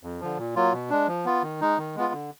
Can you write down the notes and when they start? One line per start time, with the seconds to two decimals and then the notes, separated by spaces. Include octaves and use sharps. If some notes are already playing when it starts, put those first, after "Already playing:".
0.03 F2
0.21 D3 F3
0.37 A#2
0.56 F#3 A#3 F4
0.73 B2
0.90 G#3 D4
1.08 F3
1.25 B3 F4
1.43 D#3
1.61 G#3 D#4
1.78 D#3
1.95 G#3 B3 F4
2.13 D3